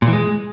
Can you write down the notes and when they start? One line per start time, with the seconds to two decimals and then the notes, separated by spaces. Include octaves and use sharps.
0.02 A#2
0.07 E3
0.13 G#3